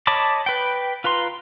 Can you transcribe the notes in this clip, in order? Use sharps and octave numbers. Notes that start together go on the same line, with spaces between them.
C#5 D#5 A5 B5 D6
B4 G5
F4 B4 A#5 C6